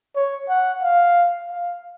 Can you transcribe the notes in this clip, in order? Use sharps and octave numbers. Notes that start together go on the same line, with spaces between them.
C#5
F#5
F5
F5